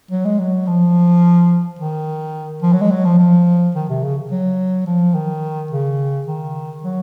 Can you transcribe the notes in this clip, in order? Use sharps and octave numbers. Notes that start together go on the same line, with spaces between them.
F#3
G#3
F#3
F3
D#3
F3
F#3
G#3
F#3
F3
F3
D#3
C3
C#3
F#3
F3
D#3
C#3
D#3
F#3